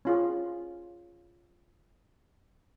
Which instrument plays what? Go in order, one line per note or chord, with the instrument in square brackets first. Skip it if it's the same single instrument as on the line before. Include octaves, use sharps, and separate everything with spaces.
[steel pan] C#4 F4 G#4